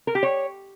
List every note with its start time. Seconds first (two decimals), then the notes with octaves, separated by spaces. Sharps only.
0.07 A#4
0.15 G4
0.23 C#5